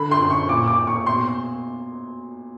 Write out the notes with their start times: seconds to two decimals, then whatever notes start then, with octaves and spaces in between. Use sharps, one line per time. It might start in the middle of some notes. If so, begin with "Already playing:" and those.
Already playing: D3 B5
0.11 C6
0.20 F#2
0.30 C#6
0.48 A#2 D6
0.68 D6
0.78 A#2
0.87 C#6
1.06 B2 C6